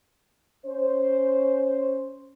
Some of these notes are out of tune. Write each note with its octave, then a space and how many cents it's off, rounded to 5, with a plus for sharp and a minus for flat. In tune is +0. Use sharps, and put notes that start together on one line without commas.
C#4 +0 C5 +0